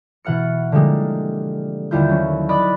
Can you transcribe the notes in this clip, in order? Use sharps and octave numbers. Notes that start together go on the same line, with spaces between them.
B2 E3 F#5 F6 C#7
D3 F3 G3 G#3 A#3
D#2 D3 G3 E4 F4 G6
F#3 C#4
D5 D#5 B5 D6 F#6